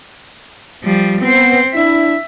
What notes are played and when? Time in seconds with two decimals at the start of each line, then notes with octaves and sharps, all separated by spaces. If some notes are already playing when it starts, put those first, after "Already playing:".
0.83 F3 G3
1.21 B3 C4 C5
1.74 D4 E4 E5